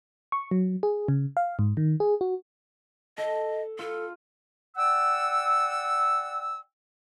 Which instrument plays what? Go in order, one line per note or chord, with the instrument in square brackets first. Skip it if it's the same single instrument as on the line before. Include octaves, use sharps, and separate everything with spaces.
[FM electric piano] C#6
F#3
G#4
C#3
F5
G#2
D#3
G#4
F#4
[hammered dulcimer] A4 [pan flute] D#5
[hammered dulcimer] F4 [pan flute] A4
[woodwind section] D5 F#5 G5 E6